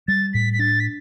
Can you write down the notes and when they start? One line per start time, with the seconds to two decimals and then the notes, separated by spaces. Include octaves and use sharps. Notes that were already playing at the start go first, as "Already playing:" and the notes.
0.08 G3 A6
0.33 A2 B6
0.53 B6
0.59 D4 A6
0.80 B6